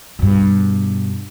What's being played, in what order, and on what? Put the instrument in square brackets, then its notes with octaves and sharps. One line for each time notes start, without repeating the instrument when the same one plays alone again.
[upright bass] G2 B2